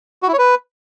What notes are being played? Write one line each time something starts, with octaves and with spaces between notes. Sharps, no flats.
F#4
E4
C#5
B4